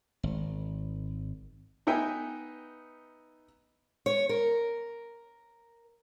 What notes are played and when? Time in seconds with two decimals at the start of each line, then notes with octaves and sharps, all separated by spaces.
0.23 G#1
1.87 B3 D#4 B4 E5 G5 G#5
4.06 C#5
4.29 A#4